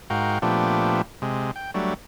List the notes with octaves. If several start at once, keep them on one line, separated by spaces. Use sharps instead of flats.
G#2 F#4 A#4 F5 G5
A#2 F3 A3 B3 D4 G4
C3 G#3
G5
F#3 G3 A3 D4